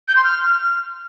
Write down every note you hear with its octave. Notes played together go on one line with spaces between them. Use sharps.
G6
C6
F6